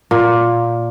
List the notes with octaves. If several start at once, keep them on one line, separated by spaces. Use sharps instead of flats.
A#2